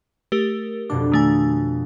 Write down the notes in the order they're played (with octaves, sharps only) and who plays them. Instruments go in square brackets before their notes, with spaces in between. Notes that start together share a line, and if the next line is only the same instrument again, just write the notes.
[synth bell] A3 G4 A#4
[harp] F2 B2 D4 [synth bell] D6
[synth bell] D#3 A3 G#5